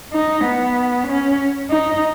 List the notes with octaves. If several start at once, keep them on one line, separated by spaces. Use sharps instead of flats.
D#4
B3
C#4
D#4